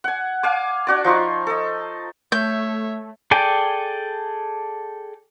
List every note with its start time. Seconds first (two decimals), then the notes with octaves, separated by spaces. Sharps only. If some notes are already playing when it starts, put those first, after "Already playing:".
0.04 F#5 G#5
0.43 F5 G#5 D6
0.87 D4 F#4 D5
1.04 F3 D#4 F4 C#6
1.47 A4 D#5
2.32 A3 C#5 E5 G6
3.31 G#4 A4 D5 G5 G#5